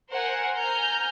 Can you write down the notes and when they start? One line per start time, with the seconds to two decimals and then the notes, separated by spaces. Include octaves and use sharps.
0.10 A#4 C5 F#5 G#5
0.57 G#5 A#5 F6 G6